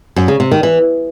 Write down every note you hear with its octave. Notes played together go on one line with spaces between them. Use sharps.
F#2
C#3
C3
D#3
E3